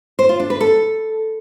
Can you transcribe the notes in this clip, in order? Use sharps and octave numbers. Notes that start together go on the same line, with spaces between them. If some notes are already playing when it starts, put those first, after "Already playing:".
C5
F4
D4
B4
A4